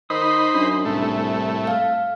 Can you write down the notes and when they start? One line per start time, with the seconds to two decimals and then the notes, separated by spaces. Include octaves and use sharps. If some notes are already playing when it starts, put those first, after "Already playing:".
0.10 D#3 D#4 C5 B5 D#6
0.55 F#2 D4
0.85 C2 A2 A3
1.67 F5